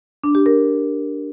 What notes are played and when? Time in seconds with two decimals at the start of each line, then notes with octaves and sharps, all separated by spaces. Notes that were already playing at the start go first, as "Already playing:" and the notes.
0.24 D4
0.35 G4
0.46 A#4